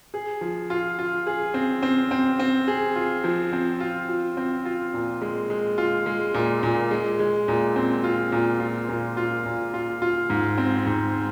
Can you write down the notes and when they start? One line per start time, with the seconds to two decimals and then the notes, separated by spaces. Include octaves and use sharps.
0.14 G#4
0.41 F3
0.70 F4
0.99 F4
1.27 G#4
1.54 C4
1.83 C4
2.11 C4
2.39 C4
2.68 G#4
2.96 F4
3.24 F3
3.53 C4
3.80 F4
4.09 F4
4.37 C4
4.66 F4
4.94 A#2
5.22 G#3
5.50 G#3
5.78 F4
6.06 G#3
6.34 A#2
6.63 A#2
6.91 G#3
7.19 G#3
7.48 A#2
7.76 C4
8.04 F4
8.32 A#2
8.60 F4
8.89 A#2
9.17 F4
9.46 A#2
9.74 F4
10.02 F4
10.30 G#2
10.58 C4
10.86 G#2